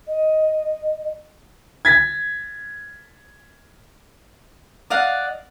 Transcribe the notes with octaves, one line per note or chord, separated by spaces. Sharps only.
D#5
G#6 A6 B6
D5 D#5 F5 F#5